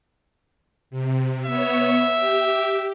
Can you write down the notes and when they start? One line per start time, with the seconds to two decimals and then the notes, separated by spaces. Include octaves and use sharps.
0.90 C3
1.45 B3 C#5 E5
2.15 G4